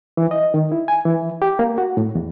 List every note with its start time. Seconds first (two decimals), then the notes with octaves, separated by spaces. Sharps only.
0.17 E3
0.31 D#5
0.54 D#3
0.72 E4
0.88 G#5
1.05 E3
1.42 G4
1.59 A#3
1.78 F#4
1.97 A2
2.15 E2